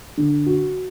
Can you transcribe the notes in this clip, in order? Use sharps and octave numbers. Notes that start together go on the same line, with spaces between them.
D3
F#4